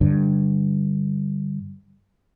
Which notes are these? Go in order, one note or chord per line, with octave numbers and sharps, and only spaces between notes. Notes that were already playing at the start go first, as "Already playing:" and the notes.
G2 D3